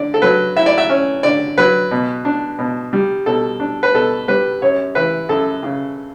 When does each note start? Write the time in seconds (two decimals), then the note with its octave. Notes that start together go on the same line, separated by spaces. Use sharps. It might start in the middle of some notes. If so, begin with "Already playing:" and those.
Already playing: D3 D5
0.14 A4
0.22 F#3 B4
0.57 E4 E5
0.66 D5
0.78 E5
0.89 C#4
1.23 D3 D5
1.58 F#3 B4
1.91 B2
2.25 D4
2.59 B2
2.93 G3
3.26 B2 A4
3.60 D4
3.83 B4
3.94 B2 A4
4.28 G3 B4
4.62 F#2 C#5
4.95 E3 B4
5.29 F#2 A4
5.63 C#3